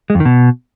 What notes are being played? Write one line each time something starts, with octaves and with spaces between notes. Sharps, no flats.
G#3
F2
D#3
B2